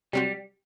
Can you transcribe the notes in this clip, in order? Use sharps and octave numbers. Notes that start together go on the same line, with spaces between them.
C3 F#3 G3 C4 F#4